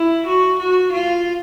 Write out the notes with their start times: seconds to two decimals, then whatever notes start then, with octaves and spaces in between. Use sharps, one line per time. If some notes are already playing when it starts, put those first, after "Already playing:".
Already playing: E4
0.27 F#4
0.59 F#4
0.93 F4